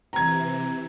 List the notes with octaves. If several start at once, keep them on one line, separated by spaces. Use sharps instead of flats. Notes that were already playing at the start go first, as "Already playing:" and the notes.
C3 E3 A#5 G#6